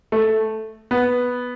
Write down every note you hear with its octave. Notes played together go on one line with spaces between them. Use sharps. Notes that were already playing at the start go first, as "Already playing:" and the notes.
A3
B3